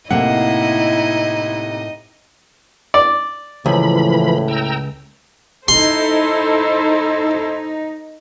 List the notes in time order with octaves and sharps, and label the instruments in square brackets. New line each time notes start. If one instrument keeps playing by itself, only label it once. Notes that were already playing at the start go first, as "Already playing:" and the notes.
[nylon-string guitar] A2 A#3 [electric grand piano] C3 F#5 [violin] D#4 D#5 [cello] E4
[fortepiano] D5
[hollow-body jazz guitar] C#2 [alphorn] A2 [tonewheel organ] E3 F3 B5
[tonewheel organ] G5 A#5 E6
[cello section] D#4 [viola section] E4 A4 C5 [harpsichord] C6